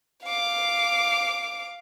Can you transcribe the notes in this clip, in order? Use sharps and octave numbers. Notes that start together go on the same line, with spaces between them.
F5 D6